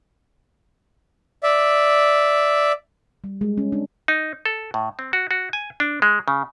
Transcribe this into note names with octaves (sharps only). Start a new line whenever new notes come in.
D5 E5
G3
G#3
C#4
D4
D#4
A4
A2
C4
F#4
F#4
G#5
D4
G#3
C#3